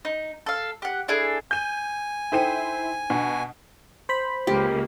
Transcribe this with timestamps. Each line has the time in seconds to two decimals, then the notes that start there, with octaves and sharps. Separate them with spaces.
0.05 D#4
0.46 A4 F5
0.82 G4 F#5
1.08 D4 E4 G#4 A4
1.51 G#5 G6 D#7
2.32 D#4 E4 A4 C5 G5 D#7
3.10 B2 D4
4.09 C5 B5
4.47 C#2 A#3 G4